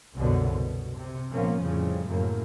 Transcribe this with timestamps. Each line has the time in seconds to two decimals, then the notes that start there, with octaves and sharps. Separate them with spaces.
0.16 C2 F#2 B2 D3
0.52 B2
0.96 C3
1.32 A#1 G#2 F3 A#3 B3 C#4
1.62 F2 A2 C#3 F3 G3
2.08 F#2 A2 A#3